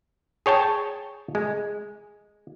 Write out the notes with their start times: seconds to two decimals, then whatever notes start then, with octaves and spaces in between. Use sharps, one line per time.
0.46 G#4 C#5 G5 A5
1.35 G#3